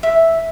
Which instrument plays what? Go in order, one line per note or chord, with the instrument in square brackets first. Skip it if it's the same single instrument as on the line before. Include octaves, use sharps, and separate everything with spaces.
[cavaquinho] E5